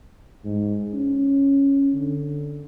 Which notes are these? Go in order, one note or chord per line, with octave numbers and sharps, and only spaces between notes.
G#2
C#4
D3